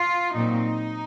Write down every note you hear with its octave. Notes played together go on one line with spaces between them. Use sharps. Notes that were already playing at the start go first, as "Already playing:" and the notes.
Already playing: F4
A#2 F#3 C4 D#4